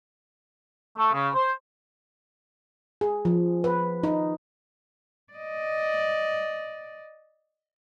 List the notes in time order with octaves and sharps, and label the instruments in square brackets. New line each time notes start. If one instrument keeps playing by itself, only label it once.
[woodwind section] A3
C#3
C5
[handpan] G#4
F3
B4
D#4
[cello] D5 D#5